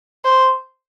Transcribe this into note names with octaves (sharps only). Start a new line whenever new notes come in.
C5